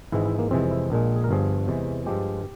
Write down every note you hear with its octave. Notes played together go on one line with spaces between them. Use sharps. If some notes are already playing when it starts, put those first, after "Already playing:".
G#1 G#2 E3 G#3 E4
E4
A#3
F2 C3 E3 G#3 C4
E4
A#1 A#2 G#3
G#4
A#4
G1 G2 F3 G#4
E2 C3 E3 G#3
G2 F3 G#3 G4